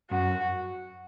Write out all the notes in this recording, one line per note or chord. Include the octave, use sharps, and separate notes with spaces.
F#2 F#4